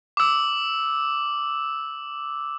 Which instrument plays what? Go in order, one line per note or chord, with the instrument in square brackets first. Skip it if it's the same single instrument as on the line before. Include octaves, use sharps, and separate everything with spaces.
[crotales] D6 E6